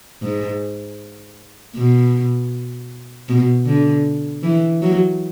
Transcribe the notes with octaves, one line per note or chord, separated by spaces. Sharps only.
G#2
B2
B2
D3
E3
F#3